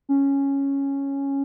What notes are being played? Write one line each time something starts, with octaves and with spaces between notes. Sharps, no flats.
C#4